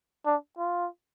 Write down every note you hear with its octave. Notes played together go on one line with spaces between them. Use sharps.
D4
F4